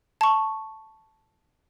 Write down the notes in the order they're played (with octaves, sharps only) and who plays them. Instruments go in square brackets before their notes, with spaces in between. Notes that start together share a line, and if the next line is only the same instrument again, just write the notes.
[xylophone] A5 C#6